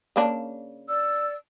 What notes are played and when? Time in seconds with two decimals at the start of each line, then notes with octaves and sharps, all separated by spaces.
0.16 C#3 A#3 D4
0.88 D5 E6